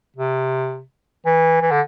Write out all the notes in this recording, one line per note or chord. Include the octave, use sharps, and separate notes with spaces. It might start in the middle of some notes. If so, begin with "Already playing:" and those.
C3
E3
E3
D3